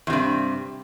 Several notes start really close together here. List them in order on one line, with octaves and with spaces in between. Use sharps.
E2 C3 G2